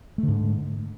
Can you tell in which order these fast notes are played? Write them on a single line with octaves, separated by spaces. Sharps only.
A3 D3 G#2